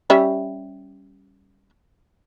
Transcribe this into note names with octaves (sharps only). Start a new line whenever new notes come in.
G3 C#4 E5